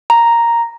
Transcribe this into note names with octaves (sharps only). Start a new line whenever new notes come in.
A#5